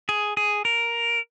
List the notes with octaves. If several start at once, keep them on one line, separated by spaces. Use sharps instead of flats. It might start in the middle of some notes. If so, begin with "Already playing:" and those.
G#4
G#4
A#4